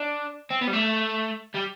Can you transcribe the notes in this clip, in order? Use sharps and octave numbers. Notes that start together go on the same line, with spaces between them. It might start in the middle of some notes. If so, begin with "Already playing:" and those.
Already playing: D4
C4
B3
G3
A3
G3